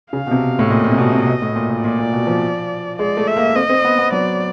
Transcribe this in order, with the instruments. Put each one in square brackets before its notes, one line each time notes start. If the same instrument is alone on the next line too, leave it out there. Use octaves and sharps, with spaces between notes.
[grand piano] C#3 [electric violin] F5
[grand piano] B2
C3
A2
[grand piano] A#2 [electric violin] D#5
[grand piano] A#2
C3
B2
C3
B2
A2
A#2
A#2
[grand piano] A#2 [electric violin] D5
[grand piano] A#2
B2
F3
[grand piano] G#3 [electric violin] D5
[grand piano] A3
[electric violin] E5
[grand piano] A#3
[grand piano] C4 [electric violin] D#5
[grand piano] C4
B3
B3
[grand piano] F#3 [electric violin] D5